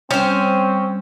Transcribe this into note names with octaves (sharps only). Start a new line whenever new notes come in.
G3 C4 C#4 C5 G5